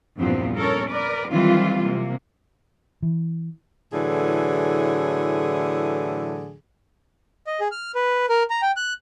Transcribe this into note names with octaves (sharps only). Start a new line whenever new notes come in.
E2 G2 A#2 F3 B3 C4
C#4 A4 A#4 C#5
A#4 B4 D5
D#3 E3 F#3 G3 C4 F4
C3 A#3
E3
A2 D3 E3 F#3 G#4
D#5
G#4
F6
B4
A#4
A#5
G5
F#6